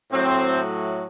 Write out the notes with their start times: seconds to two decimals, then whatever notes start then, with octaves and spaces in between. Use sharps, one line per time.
0.12 A2 F#3 A3 C4